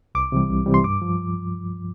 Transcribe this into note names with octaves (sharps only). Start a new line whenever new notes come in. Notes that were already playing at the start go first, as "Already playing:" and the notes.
C2 D6
C3 E3 G3
C2
C3 E3 G3
C6
G2 D6
F3